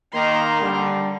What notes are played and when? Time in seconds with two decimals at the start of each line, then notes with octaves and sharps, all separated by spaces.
0.12 D#3 A#3 A#5 C6
0.61 D3 G3